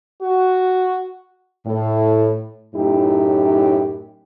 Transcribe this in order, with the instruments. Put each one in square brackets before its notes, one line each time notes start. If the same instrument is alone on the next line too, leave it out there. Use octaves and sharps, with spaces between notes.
[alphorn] F#4
[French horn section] A2
F#2 A2 D#4 E4 G4